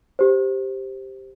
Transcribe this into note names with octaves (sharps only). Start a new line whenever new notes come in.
G4 C5